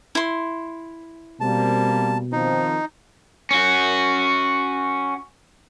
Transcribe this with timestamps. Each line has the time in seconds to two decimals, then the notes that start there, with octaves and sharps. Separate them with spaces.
0.15 E4 C6
1.41 B2 G3 A#3 C4 A5
2.32 D#3 F3 C4 D#4
3.51 C#4 F#4